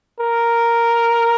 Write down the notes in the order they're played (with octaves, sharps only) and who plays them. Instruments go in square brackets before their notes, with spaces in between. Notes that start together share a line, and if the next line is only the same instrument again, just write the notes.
[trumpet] A#4